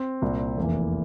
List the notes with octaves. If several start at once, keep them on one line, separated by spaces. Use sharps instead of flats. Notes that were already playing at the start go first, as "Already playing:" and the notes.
Already playing: C4
C2 A#2
F1 E2 E3 A#3